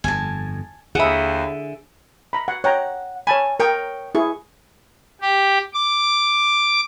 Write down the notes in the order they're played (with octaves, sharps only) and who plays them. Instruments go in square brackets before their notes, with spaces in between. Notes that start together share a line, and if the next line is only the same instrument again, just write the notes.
[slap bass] G1 F2 [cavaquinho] G#5 A5
[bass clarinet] D#2 [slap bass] D3 [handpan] G#4 E5 [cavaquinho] F#5 B5
[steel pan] A#5 B5
F#5
[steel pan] C#5 G5 A#5 [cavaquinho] F#5
[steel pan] C#5 A5 B5 [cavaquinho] G#5
[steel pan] A#4 [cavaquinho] C#5 G5 D#6
[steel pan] E4 G#4 [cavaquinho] C#6
[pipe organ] G4
D6